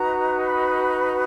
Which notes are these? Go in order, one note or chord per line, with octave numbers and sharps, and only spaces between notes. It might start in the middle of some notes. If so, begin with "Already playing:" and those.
Already playing: D#4 F#4 B4 A#5
B5